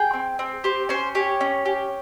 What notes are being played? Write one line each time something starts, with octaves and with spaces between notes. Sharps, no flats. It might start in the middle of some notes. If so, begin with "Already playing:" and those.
Already playing: G#4 G5
C4
C4
G4 C5
C#4 C5
G4 C#5
C#4
G4